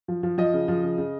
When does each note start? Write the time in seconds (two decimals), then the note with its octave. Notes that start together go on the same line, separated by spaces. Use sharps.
0.08 F3
0.23 F3
0.38 F3 D#5
0.54 C#3
0.68 F3
0.83 C#3
0.98 C#3